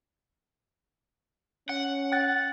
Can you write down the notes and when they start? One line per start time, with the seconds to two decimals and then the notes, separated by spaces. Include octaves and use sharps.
1.69 C#4 F#5
2.12 G5 F#6 A6